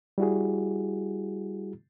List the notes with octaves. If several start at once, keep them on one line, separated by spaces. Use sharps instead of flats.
G3 E4 F#4 G#4